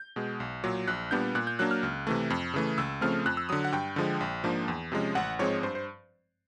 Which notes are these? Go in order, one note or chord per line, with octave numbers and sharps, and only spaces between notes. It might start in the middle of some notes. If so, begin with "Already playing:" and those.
Already playing: G6
B2 G#3
B1
A#2 F#3
A#1 F#6
A#2 G3 B3 D4 G6
A#2 F#6
G6
F#3 A#3 D4 F#6
F6
C#2
C3 E3 A3
F2
C#3 E3 A3
C#2 E6
C#3 F3 A3 C4 F6
F2 F#6
E6
D3 F#3 D#6
F#5
G2 G5
D3 F3 G#3
A#1
G#2 F3 A#3 D4
E2
C3 F3 G#3 C#4
A1 F#5
G#2 F3 G#3 C4 C#5
G2 C5
C5